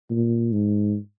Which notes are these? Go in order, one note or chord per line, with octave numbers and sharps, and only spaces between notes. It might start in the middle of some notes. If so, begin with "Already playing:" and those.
A#2
G#2